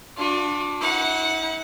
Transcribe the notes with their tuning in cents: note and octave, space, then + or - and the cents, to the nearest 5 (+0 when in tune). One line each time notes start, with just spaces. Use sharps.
D4 +0 F#4 -45
E4 -40 F#5 +0